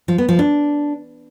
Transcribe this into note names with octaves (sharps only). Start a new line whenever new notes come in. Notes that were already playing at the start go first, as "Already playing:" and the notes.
F3
B3
F3
D4